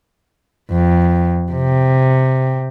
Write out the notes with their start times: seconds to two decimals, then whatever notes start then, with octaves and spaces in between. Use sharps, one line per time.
0.71 F2
1.53 C3